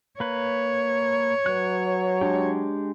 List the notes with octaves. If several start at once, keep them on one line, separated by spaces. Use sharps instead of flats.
A#3 B4 C#5
F#3 B4 F#6
G#3 D4 G4